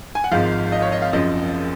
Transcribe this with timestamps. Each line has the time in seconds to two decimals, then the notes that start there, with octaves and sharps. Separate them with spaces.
0.15 G#5
0.24 F#5
0.31 G#1 G#2 F3 F5
0.72 D#5
0.82 C#5
0.92 D#5
1.02 F5
1.13 F#1 F#2 F3 D#5